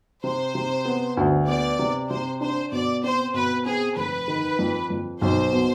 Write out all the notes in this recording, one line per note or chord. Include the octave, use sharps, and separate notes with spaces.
C3 C5
C3
B3
D2
B3 D5
C3
C3 C5
D4 C5
B2 D5
C4 C5
B2 B4
C4 G#4
F1 B4
D#3
F2
F2
B1 C5
B2